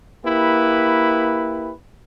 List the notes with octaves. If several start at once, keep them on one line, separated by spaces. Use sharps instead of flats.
A#3 E4 G4 B4